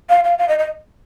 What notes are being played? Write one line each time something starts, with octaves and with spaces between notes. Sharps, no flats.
F5
F5
F5
D#5
D#5